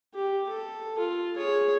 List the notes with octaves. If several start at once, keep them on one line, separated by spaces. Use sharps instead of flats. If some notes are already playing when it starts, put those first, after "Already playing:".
G4
A4
F4
G#4 C#5